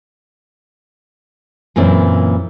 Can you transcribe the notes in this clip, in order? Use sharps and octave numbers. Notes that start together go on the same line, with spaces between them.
F#2 A#2 E3 C4 E4